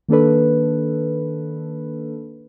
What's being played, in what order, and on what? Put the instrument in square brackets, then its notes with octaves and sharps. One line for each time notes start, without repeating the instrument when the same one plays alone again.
[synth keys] D#3 A#3 D4 A4 B4